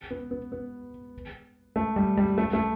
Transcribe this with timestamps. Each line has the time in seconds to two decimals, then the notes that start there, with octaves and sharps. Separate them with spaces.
0.10 B3
0.31 B3
0.52 B3
1.76 A3
1.96 G3
2.17 G3
2.38 A3
2.53 A3